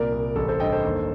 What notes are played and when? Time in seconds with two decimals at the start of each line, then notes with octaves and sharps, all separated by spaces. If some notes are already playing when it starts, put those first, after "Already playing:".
Already playing: C2 A#2 A#4 D5
0.12 C2
0.36 A1 A4
0.48 A4 C5
0.60 G2 D#5 G5
0.72 A4 C5
0.84 D#2